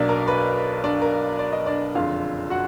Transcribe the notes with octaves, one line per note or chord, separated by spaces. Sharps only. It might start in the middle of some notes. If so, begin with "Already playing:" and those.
Already playing: B1 B2 F#3 A#3 D4 D5
A#4
B4
D4 D5
A#4
D5
D#5
D4 D5
F#1 F2 D3 F4 F5
F#4 F#5